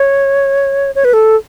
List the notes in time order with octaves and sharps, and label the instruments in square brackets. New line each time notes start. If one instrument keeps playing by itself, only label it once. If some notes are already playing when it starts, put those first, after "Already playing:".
Already playing: [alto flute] C#5
C#5
B4
A4